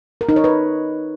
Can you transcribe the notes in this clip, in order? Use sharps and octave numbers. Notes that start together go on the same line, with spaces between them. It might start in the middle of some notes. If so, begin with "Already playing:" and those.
A#4
D#4
C#5
B4